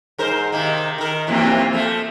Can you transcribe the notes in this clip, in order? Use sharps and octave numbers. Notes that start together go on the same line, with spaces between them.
G#2 A#4 C5
C3 D#3 A#3
D#3 A#4
F2 C3 E3 A#3 C4 F4
F3 A3